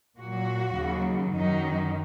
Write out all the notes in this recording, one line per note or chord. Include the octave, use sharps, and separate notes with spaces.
A#2 F#3 F#4
D#2 C#3 F#3
F#2 D#3 F#3 D#4